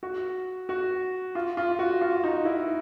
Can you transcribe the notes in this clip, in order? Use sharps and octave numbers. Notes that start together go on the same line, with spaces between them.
F#4
F#4
F4
F4
F#4
F4
D#4
E4